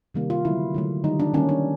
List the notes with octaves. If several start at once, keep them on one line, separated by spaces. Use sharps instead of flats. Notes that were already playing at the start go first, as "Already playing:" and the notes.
C3 D#3 G3 A#3
F4
D3 F#3 A3 E4
D3 F#3 A3
D#3 G3 A#3 D#4
D4
D#3 G3 A#3 C#4
D4